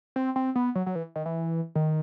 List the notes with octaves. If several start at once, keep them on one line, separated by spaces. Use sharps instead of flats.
C4
C4
B3
F#3
F#3
E3
D#3
E3
D#3